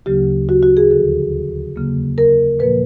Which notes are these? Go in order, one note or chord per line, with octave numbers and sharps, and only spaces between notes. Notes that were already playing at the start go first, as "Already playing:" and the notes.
D2 C#3 F#3 A#3 D4 G4
F#4
F#4
G#4
D#2 D3 F3 A4
E2 C#3 F#3 A#3
A#4
A#2 F3 A#3 B4